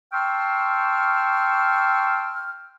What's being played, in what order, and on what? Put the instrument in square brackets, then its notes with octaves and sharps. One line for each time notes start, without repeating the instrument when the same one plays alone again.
[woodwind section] G5 A5 C6 C#6 E6 F6